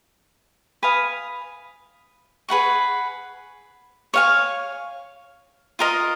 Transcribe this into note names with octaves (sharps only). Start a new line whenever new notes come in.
B4 F5 G#5 D#6
G#4 B4 F#5 C#6
C#5 F5 G#5
F4 A#4 D#5